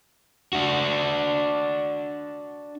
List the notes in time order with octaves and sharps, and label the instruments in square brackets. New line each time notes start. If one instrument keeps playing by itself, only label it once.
[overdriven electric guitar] D4 F#4